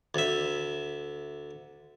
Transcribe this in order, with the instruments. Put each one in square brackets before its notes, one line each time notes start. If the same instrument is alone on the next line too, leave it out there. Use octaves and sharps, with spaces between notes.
[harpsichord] D2 E5